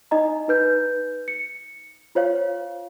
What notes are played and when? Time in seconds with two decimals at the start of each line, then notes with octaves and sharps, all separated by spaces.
0.11 D#4 D#5 A#5
0.48 D#4 B4 G6
1.28 C#7
2.15 F4 C5 C#5 F5